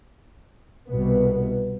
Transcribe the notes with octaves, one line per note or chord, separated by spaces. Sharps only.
C2 B2 B3